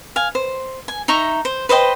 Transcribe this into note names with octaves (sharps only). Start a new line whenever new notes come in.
F5 G#5
C5
G#5
D#4 E5 A#5 C#6
C5
B4 C5 D#5 G5